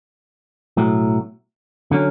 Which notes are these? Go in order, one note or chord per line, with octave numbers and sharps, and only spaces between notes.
B1 A2 F#3
D3 F#3 C#4